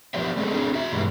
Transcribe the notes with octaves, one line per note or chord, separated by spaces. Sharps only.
F2 F3 B3 G4 D5 E5
G#3 A3 B3 F#4 G#4 A4
A3 C4 D4 G#4
F#4 E5
G2 B2 E3 G3 G#3